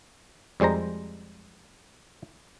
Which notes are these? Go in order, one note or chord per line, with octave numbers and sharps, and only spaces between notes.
F2 G3 G#3 C5 A#5